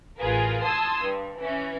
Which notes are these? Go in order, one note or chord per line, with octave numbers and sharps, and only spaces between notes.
A1 F4 G#4 A#4 B4
A5 C6 D#6 E6 G#6
G2
E3 C#4